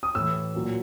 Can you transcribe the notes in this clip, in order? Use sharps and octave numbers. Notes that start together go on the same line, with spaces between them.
D#6
A2 E3 E6
A#2 F#3